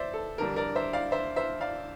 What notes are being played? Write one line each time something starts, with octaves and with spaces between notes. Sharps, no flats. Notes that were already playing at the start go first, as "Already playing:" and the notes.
Already playing: C5 D5 E5
A4
F2 D3 G3 D4 A#4
A#4 D5
C5 E5
D5 F5
C5 E5
C5 E5
D5 F5